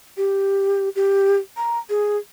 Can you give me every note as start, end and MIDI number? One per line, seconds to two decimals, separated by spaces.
0.17 0.89 67
0.96 1.37 67
1.57 1.79 82
1.89 2.17 68